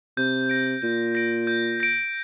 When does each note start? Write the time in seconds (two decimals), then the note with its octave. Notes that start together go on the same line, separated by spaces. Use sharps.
0.17 C3 G6
0.50 A#6 D7
0.82 A#2 G6
1.15 A#6 D7
1.47 G6
1.80 A#6 D7